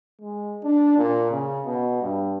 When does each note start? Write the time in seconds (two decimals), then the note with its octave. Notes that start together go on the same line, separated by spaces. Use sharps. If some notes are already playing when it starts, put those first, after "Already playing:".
0.21 G#3
0.63 D4
0.97 A#2
1.31 C#3
1.65 B2
2.02 G2